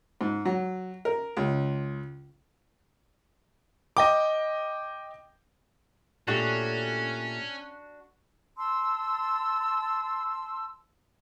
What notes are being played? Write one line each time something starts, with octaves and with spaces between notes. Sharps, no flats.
G#2
F#3
A#4
C#2
D#5 G5 D6
A#2 A3 C#4 D4 F#4 G4
A5 C6 E6